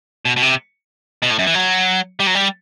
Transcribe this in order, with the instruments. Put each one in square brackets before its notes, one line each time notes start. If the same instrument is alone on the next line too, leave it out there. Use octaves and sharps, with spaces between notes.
[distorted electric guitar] B2
B2
C3
B2
A2
F#2
E3
F#3
G3
F#3
G3